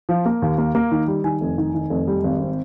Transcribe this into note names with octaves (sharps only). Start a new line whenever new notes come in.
F3
A#3
D#2
A#3
A#3
D#3
G3
D#3 G#5
F1
D#3
D#3
F1
G3
G#1
C4